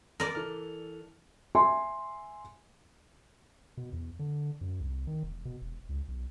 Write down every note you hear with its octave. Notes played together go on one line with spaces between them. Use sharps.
A#4 D5
E3 A4 F6
E5 G#5 C6
B2
E2
D3
F#2
C2
D#3
E1
B2
E1
C#2
B1